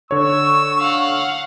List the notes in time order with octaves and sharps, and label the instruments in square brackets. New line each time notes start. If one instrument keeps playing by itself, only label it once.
[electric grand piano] D3 C#5 [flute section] C#6 [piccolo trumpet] E6
[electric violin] F5 F#5